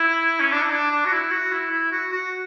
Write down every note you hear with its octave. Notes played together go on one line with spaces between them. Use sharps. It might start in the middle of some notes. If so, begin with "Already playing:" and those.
Already playing: E4
C#4
D4
E4
D4
D4
F#4
E4
F#4
E4
E4
F#4
F#4